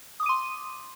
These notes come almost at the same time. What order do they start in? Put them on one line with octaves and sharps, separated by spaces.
D#6 D6 D#7 C6